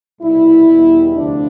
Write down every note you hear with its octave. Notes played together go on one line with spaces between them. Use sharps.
C2 B2 G3 E4
E2 B2 G3
D2 C3 F3 D4